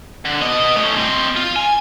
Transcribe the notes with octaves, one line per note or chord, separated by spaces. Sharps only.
D3
B3 D#5
A3 C#4
C4 D#5
F4
G#5